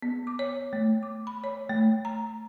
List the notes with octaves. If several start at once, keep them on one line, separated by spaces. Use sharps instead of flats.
B3
D6
C#5
A3
D6
B5
C#5
A3
A#5